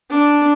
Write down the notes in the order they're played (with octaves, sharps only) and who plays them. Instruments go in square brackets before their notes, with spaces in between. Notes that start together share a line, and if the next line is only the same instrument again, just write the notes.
[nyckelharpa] D4